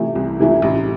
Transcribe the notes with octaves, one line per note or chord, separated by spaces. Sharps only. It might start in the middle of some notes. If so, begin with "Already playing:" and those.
Already playing: C3 E3 A3 E4
C2
C3 E3 A3 E4
A1